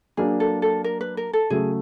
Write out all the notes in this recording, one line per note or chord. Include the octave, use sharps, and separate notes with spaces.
F#3 A#3 D4 G#4
A4
A4
A#4
B4
A#4
A4
C#3 F#3 A3 G#4